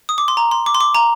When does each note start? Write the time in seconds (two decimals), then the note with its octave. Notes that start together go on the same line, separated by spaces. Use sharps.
0.09 D#6
0.18 D6
0.28 C6
0.37 A#5
0.51 C6
0.66 D6
0.75 C6
0.81 D6
0.95 A#5